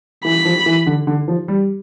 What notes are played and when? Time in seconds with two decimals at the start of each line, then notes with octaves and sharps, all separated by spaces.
0.25 E3 B5
0.45 F3
0.66 E3
0.86 D3
1.07 D3
1.28 F3
1.48 G3